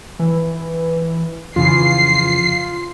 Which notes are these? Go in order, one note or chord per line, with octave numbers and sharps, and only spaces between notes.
E3
F2 C#3 E3 F4 C7